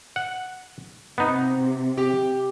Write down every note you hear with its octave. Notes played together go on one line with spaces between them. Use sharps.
F#5
C3 B3 D#4
G4